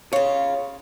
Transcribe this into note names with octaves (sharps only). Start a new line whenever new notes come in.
C#3 F4 C#5